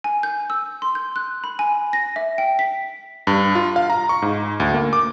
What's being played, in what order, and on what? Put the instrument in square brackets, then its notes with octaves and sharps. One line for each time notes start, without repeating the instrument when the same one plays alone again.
[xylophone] G#5
G6
E6
C6
G6
F#6
B5
G#5
A#6
E5
G5
B6
[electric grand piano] G2
F4
F5
A#5
C#6
G#2
D2
A#3
D6